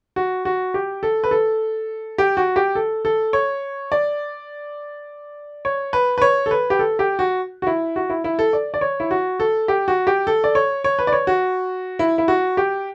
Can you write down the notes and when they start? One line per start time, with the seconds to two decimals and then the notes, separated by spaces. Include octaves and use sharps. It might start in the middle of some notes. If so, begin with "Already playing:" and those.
0.16 F#4
0.45 F#4
0.74 G4
1.03 A4
1.24 B4
1.31 A4
2.18 G4
2.37 F#4
2.56 G4
2.75 A4
3.05 A4
3.33 C#5
3.92 D5
5.65 C#5
5.93 B4
6.18 B4
6.22 C#5
6.46 A4
6.51 B4
6.70 G4
6.79 A4
6.99 G4
7.19 F#4
7.62 F#4
7.67 E4
7.96 F#4
8.10 E4
8.24 E4
8.39 A4
8.53 D5
8.74 D5
8.81 C#5
9.00 E4
9.11 F#4
9.40 A4
9.68 G4
9.88 F#4
10.07 G4
10.27 A4
10.44 D5
10.55 C#5
10.84 C#5
10.99 B4
11.07 D5
11.12 C#5
11.27 F#4
11.99 E4
12.18 E4
12.28 F#4
12.57 G4